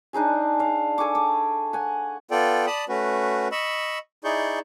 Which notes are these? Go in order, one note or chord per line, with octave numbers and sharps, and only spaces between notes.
D4 D#4 G#4 G#5
D5 F5
A4 G#5 C#6 D6
D6
F#5 G#5
B3 F4 A4 D5 G5
D5 A5 B5 D#6
A3 C#4 F#4 B4
D#5 B5 C#6 E6
D#4 E4 G#4 D5 C#6 G6